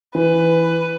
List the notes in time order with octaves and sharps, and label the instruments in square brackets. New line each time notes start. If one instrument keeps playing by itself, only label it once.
[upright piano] E3 [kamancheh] B4